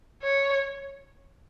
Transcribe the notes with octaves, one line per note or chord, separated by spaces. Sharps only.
C#5